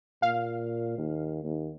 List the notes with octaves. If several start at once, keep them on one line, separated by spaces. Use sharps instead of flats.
A#2 F5
D#2
D#2